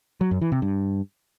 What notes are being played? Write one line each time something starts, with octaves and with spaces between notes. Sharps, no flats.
F#3
F#2
E3
C3
G2